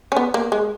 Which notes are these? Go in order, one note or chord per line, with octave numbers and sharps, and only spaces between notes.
C#4
B3
A#3
G#3